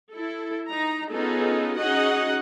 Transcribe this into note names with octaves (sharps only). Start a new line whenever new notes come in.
E4 A4
D#4 A#5
B3 C#4 D#4 F4 G#4 A4
C#4 D#4 F#4 G#4 D#5 F#5